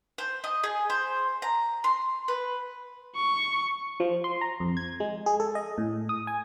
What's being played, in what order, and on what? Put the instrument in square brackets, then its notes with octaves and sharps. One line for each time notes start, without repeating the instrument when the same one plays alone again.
[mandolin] C5
D#5
G#4
C5
A#5
C6
B4
[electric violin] C#6
[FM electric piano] F3
C6
A#5
F2
G#6
G#3
G#4
A4
D#5
A2
D#6
G#5